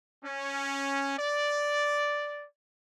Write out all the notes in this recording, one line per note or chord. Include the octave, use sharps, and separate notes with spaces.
C#4
D5